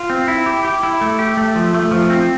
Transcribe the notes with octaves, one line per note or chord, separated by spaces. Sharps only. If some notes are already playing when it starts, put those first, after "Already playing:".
Already playing: F4
C4
E4
G4
G4
E4
A3
G4
A3
F3
A3
F3
C4